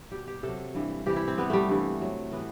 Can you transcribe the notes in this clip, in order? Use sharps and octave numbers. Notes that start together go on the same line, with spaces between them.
B2 G3 G4
G4
C3 F#3 A4
G2 E3 G3
C3 E3 G3 G4
E4
C4
C3 G3 B3
G3 A3
G2 E3 G3
C3 F#3
A2 E3 G3 B3